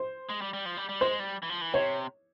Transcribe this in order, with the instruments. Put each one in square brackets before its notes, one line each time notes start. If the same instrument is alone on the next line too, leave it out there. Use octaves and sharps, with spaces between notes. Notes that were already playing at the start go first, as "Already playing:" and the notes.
Already playing: [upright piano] C5
[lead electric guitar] G#3
G3
G3
F3
G3
G3
[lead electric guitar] G#3 [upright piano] C5
[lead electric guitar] G3
E3
F3
E3
[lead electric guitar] C3 [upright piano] C#5